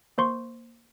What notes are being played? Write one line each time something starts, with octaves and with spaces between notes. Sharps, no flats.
A#3 C5 C6 C#6